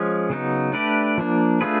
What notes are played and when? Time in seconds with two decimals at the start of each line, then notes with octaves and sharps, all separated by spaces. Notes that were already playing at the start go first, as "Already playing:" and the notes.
Already playing: F3 G#3 C#4
0.30 C#3 F#3 B3 D#4
0.73 A3 D4 G4 B4 D5
1.18 F3 A#3 D4
1.61 A3 D4 F4 G#4 B4